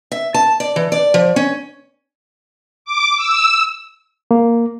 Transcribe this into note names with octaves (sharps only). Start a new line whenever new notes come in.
E5
A5
D5
E3
D5
F3
C#4
D6
E6
A#3